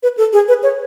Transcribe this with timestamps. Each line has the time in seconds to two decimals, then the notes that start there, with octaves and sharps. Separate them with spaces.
0.03 B4
0.17 A4
0.33 G#4
0.48 B4
0.63 C#5